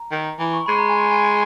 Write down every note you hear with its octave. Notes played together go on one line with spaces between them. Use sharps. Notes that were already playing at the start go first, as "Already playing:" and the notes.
Already playing: A#5
D#3
E3
C#6
G#3 B5
A#5
G#5
G#5